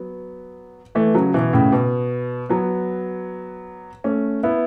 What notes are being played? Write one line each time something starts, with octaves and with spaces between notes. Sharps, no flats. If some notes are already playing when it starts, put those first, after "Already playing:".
Already playing: F#3 B3
E3 A3
C#3 F#3
B2 E3
A2 C#3
B2
F#3 B3
A3 C#4
B3 E4